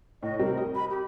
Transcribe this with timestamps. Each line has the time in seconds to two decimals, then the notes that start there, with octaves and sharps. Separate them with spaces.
0.23 A2 D#5
0.39 C3 G3 C4 A#4
0.58 D#5
0.75 B5
0.90 G4